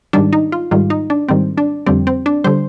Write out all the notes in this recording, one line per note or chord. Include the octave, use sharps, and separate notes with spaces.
G#2 D#3 G3 D4
D#4
F4
G#2 D#3 G3 F4
D#4
D4
G#2 D#3 G3 C4
D4
F2 D3 G3 C4
C4
D4
D3 G3 C5